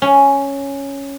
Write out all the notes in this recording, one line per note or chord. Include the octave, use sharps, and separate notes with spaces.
C#4